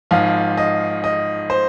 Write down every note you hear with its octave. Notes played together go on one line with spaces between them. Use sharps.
G#1 G#2 F3 F5
D#5
D#5
C5